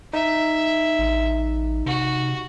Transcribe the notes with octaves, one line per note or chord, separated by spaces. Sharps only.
D#4 E5
A1
C3 F#4